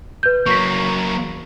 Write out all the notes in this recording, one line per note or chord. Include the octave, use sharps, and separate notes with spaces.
B4 G6
F#3 A#3 C#6 B6